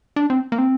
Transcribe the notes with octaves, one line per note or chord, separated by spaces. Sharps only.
D4
C4
A#3
C4